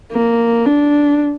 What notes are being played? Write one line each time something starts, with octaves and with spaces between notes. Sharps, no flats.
A#3
D4